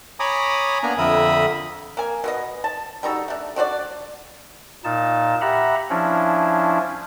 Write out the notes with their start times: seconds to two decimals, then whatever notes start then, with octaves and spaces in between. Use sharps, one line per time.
0.20 C#5 G#5 A#5 B5 D6 D#6
0.83 A#3 B3 D4 G#5 A#5
0.98 F2 D3 A#4 E5 B5 D#6
1.97 A#3 G#5
2.24 B2 B3 D#5
2.64 A5
3.03 G3 D#4 F#4 A4
3.28 A3 D4
3.56 D4 F#4 C5 D5
4.84 A#2 D#4 A5
5.41 G4 E5 F#5 A#5 B5
5.90 F3 C#4 D4 E4